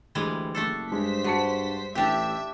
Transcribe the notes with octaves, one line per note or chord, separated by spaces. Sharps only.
D2 E3 G3 G#3
F#1 A3 D4 A4
G2 G#3 C5 B6
G#3 F#4 A5 C#7
A1 D4 G4 E5 G5